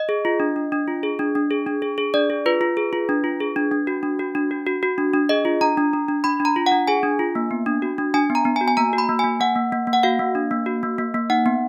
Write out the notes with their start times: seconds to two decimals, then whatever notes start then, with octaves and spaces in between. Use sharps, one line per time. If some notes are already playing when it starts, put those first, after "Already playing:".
Already playing: D#5
0.09 G#4
0.25 F4
0.40 D4
0.56 D4
0.72 D4
0.88 F4
1.03 G#4
1.19 D4
1.35 D4
1.51 G#4
1.67 D4
1.82 G#4
1.98 G#4
2.14 D4 D5
2.30 G#4
2.46 F4 B4
2.61 F4
2.77 G#4
2.93 F4
3.09 D4
3.24 F4
3.40 G#4
3.56 D4
3.72 D4
3.87 F#4
4.03 D4
4.19 F#4
4.35 D4
4.51 F#4
4.66 F#4
4.83 F#4
4.98 D4
5.14 D4
5.29 G#4 D#5
5.45 F4
5.61 D4 A#5
5.77 D4
5.93 D4
6.09 D4
6.24 D4 B5
6.40 D4
6.45 A#5
6.56 F4
6.66 F#5
6.72 D4
6.87 G#4 G#5
7.03 D4
7.19 F4
7.35 A#3
7.51 B3
7.66 D4
7.82 F#4
7.98 D4
8.14 D4 G#5
8.30 B3
8.35 A#5
8.45 B3
8.56 G#5
8.61 F#4
8.68 G#5
8.77 A#3 A#5
8.93 F#4
8.98 B5
9.09 A#3
9.19 G#5
9.24 A#3
9.40 A#3 F#5
9.56 A#3
9.72 A#3
9.87 A#3
9.93 F#5
10.03 F#4 F5
10.19 A#3
10.35 D4
10.51 A#3
10.66 F#4
10.83 A#3
10.98 A#3
11.14 A#3
11.30 D#4 F#5
11.46 B3